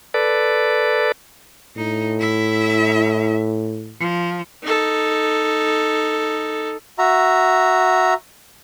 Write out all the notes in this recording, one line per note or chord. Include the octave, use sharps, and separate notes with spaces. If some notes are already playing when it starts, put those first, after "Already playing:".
A4 B4 D5
A2 D#4
E4 E5
F3
D#4 A4
F#4 E5 A#5